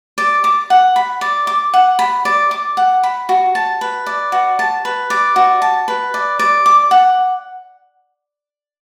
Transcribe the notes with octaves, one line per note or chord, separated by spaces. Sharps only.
D5
D6
F#5
B5
D5
D6
F#5
B5
D5
D6
F#5
B5
F#4
A5
B4
D5
F#4
A5
B4
D5
F#4
A5
B4
D5
D5
D6
F#5